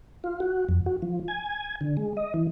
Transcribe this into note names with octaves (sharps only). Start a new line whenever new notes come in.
F4
F#4
F2
F#4
F3
G#5
D3
G#3
D#5
E3